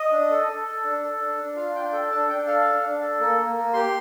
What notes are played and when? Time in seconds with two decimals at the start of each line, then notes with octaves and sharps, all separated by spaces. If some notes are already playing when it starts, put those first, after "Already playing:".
Already playing: D#5
0.11 D4
0.30 A4
0.47 A4
0.66 A4
0.84 D4
1.03 A4
1.20 D4
1.38 D4
1.56 F4 F5
1.75 D4 G5
1.92 A4 G5
2.11 D4 A5
2.28 D4 G5
2.46 A4 F5
2.65 D4
2.83 D4
3.01 A4
3.20 A#3
3.37 A#3
3.56 A#3
3.73 G4 C6